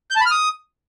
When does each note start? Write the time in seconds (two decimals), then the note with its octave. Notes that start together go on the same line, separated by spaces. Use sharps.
0.11 G6
0.16 A5
0.21 B5
0.26 F6
0.31 D#6